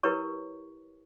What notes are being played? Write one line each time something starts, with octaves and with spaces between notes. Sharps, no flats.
E4 G4 A#4 B4 C#5 C#6